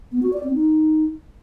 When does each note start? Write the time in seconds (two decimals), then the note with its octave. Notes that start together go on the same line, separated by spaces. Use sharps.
0.12 B3
0.23 F#4
0.33 D5
0.44 C4
0.54 D#4